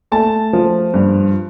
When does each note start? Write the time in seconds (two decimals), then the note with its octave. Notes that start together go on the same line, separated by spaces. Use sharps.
0.12 A3 A5
0.53 F3
0.94 G2